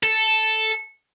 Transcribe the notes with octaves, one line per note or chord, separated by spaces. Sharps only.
A4